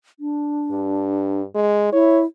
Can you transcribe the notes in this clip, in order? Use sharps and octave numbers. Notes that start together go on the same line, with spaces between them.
D4
G2
G#3
E4 C#5